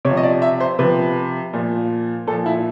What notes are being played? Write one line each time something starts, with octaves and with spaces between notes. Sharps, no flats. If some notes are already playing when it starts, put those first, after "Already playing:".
C3 F3 C#5
D#5
D5
E5
C5
C3 F3 B4
A#2 F3
A#2 F3 A4
E4